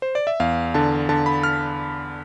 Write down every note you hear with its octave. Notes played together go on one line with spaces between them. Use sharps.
C5
D5
E5
E2 F5
D3 A5
D3 A5
B5
F6